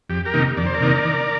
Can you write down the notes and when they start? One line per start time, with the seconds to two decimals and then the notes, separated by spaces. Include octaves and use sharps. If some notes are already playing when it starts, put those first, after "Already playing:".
0.09 F2 G4
0.25 G4 A#4
0.34 C3 D#3 A#3 D#4
0.57 F2 D5
0.66 C5
0.74 A#4 D5
0.81 C3 D#3 A#3 D#4
1.04 D#3